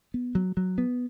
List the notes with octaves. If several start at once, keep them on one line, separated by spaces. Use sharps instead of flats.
B3
F#3
F#3
B3